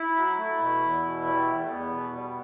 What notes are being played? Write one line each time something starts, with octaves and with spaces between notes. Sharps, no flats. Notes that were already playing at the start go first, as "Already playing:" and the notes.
Already playing: E4
F#3
A3
B2
E2
B2
G3
E2
A3
E2 B3
B2
G3